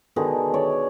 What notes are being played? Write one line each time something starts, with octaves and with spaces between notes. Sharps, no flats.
B2 D3 D#3 G#4
C#5 D5